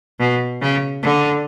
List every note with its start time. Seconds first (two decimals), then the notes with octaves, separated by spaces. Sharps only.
0.20 B2
0.61 C#3
1.02 D3